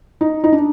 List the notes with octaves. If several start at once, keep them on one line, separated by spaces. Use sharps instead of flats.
D#4
D#4
D4